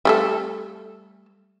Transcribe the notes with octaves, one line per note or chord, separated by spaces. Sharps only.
G3 A3 A4